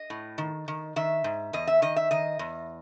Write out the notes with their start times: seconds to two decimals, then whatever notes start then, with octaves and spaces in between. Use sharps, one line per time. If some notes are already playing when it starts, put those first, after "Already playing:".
Already playing: D#5
0.10 A2
0.38 D#3
0.68 D#3
0.96 D#3 E5
1.24 G#2
1.53 E2 D#5
1.67 E5
1.82 D#3 D#5
1.96 E5
2.11 D#3 D#5
2.39 E2